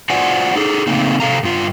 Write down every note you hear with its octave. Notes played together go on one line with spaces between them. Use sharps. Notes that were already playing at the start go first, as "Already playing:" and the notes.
F4 F#4 C5 D5 F#5 G#5
D#4 G#4 A4
C#3 A3 A#3 C4 D#4
C3 A4 F5 A#5
G2 F4